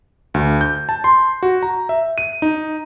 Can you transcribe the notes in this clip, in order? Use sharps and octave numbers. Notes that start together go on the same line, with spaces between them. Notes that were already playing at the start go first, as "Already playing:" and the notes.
D2
G6
A5
C6
F#4
A#5
E5
D#7
D#4